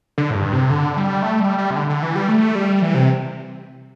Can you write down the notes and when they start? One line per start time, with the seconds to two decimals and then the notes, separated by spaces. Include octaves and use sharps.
0.18 D3
0.30 A2
0.35 G2
0.53 C3
0.70 D3
0.97 G3
1.22 A3
1.40 G3
1.58 G3
1.71 C3
1.76 D3
1.89 D3
2.02 E3
2.15 G3
2.29 A3
2.55 G3
2.82 E3
2.95 C3